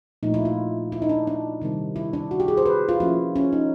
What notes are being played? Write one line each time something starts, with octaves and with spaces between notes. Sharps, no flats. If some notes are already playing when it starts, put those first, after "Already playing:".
A#2 F3 A3 D#4
E4
F4
E4
D#4
D4
D4
C3 D#3 G3 C4
E4
D4
F#4
G4
G#4
C5
B4
F4
F3 A#3 C#4 E4
C#4
D#4